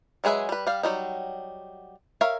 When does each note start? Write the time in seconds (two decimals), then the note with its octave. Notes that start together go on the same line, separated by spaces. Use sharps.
0.24 F#3 G#3 G#4 B4 E5
0.49 G3 B4
0.67 G3 F5
0.83 F#3 G3 D#4
2.21 A#4 C#5 E5 F5